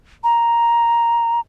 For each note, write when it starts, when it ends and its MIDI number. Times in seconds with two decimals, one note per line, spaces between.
0.24 1.40 82